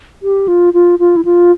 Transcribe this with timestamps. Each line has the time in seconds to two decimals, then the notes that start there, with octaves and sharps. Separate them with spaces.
0.23 G4
0.48 F4
0.74 F4
0.99 F4
1.16 E4
1.25 F4